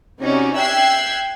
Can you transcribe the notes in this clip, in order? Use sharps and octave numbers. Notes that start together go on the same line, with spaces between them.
C3 C#4 D#4 F#4 D5
E5 G5 E6 F#6 G#6 C7